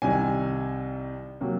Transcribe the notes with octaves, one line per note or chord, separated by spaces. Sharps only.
C2 C3 D#3 G#5
C3 F#3 A#3